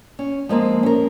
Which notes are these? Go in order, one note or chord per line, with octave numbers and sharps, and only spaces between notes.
C#4
F3 G#3 A#3 C4
C#4 A#4